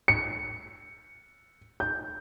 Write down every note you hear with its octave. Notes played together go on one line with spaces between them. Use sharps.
C#7
G6